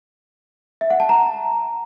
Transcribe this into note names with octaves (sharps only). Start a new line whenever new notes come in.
E5
F#5
A5
A#5